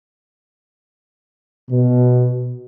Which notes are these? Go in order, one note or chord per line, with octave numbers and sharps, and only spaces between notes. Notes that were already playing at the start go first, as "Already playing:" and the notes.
B2